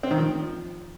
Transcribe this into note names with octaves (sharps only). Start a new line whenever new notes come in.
C4
D#3
F3